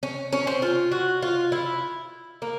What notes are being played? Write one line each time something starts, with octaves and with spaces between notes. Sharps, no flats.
C#4
C#4
C4
F4
F#4
F4
E4
A#3